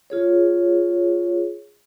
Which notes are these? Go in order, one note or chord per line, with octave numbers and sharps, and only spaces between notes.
F4 G#4 C#5